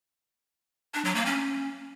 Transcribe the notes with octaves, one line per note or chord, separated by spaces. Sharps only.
D4
F#3
A#3
C#4